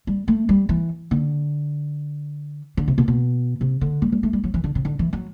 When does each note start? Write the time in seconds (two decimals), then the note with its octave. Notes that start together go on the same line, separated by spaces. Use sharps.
0.07 G3
0.28 A3
0.49 G3
0.69 E3
1.11 D3
2.77 D3
2.88 C3
2.98 B2
3.08 B2
3.61 C3
3.81 D3
4.02 G3
4.12 G3
4.23 A3
4.33 G3
4.44 F#3
4.54 E3
4.64 D3
4.75 C3
4.85 D3
4.99 E3
5.13 F#3